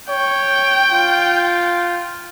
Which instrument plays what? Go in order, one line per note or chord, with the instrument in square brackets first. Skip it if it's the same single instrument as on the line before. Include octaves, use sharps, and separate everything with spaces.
[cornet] C#5 [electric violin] G5
[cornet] F4